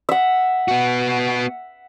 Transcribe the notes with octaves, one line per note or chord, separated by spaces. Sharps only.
E5 F#5
B3 F#4